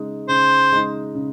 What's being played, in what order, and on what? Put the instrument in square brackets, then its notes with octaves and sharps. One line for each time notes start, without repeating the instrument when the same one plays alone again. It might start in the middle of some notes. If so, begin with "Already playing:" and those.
Already playing: [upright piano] C#3 G#3 D#4
[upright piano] C#3 [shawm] C5
[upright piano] G#3 D#4
C#3